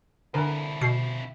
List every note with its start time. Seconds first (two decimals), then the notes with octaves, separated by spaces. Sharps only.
0.34 F2 D3 E4 A#4 B4
0.81 B2 C7